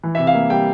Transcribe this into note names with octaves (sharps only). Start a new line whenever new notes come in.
E3
E5
C3
F5
A#3
G3 G5